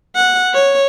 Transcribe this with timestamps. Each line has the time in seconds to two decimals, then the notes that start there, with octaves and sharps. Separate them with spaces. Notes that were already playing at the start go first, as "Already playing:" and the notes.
0.16 F#5
0.53 C#5